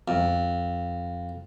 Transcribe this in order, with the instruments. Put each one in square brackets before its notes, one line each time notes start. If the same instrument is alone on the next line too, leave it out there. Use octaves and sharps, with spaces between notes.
[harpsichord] F2